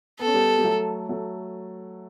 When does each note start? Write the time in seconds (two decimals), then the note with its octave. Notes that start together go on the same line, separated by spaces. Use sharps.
0.19 B3 A4
0.27 C#4
0.34 G3 B3
0.59 G3
0.64 F#3 A3
1.09 F#3 A3